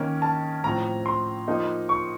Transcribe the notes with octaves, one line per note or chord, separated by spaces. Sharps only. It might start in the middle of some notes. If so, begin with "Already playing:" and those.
Already playing: D#3 A#3 C#4
A5
A2 F3 C4 A#5
C6
F3 A#3 D#4
C#6